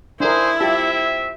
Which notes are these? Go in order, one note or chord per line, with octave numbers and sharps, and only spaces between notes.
D4 E4 G#4 A#4 C5
C4 F4 G4 E5 A5